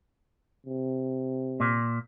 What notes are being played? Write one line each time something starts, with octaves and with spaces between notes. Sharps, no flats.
C3
A#2